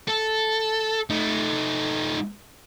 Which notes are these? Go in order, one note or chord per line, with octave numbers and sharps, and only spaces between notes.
A4
A3 D#4